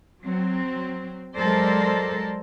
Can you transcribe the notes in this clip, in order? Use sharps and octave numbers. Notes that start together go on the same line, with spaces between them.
F#3 C4
F#3 G#3 A4 A#4 C5 D5